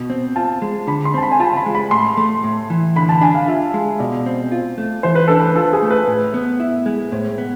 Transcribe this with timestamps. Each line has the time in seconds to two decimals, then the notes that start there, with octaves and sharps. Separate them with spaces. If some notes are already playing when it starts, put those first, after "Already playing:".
Already playing: B2
0.10 C4
0.36 F4 A5
0.62 G#3
0.87 D3 B5
1.05 C6
1.14 C4 A5
1.23 B5
1.32 G#5
1.40 F4 A5
1.57 B5
1.66 G#3
1.75 B5
1.91 A2 C6
2.17 A3
2.44 A2
2.70 E3
2.96 D3 B5
3.09 A5
3.21 D4 G#5
3.35 F5
3.48 F4 E5
3.74 G#3
3.99 B2 D5
4.26 C4
4.52 F4
4.78 A3
5.03 E3 C5
5.15 B4
5.28 D4 A4
5.40 B4
5.55 F4 A4
5.73 G#4
5.82 A3
5.91 B4
6.08 A2
6.34 B3
6.60 E4
6.86 G#3
7.12 A2 C5
7.38 B3